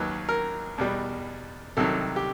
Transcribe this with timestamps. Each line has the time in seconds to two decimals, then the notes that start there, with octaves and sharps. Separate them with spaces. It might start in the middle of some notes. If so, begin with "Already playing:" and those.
Already playing: D#2 D#3 F#3 B4
0.29 A#4
0.78 E2 B2 G3
1.77 C2 C3 D#3 F#3 A4
2.16 G4